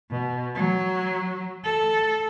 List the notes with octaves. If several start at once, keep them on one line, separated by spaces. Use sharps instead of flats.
B2
F#3
A4